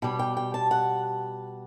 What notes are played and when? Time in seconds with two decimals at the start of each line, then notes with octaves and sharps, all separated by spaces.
0.02 B2 G3 G5
0.19 G5
0.37 G5
0.54 A5
0.71 F#5